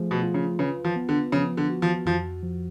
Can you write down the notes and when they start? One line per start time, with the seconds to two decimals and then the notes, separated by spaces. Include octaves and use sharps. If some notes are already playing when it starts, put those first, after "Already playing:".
Already playing: F3 A3 G#4
0.11 B2
0.23 F4
0.34 C#3
0.59 C#3 B4
0.84 F3
0.96 B3
1.09 D3
1.32 C#3 F3
1.57 D3
1.70 F#4
1.82 F3
2.05 F2 F3
2.43 F3